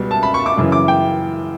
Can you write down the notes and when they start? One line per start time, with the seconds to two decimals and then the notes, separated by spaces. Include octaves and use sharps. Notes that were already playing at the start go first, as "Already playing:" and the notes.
Already playing: C#2 B2 G3
0.11 A5
0.23 B5
0.34 C#6
0.46 D6
0.57 F#2 C#3 E3
0.72 D6
0.88 G5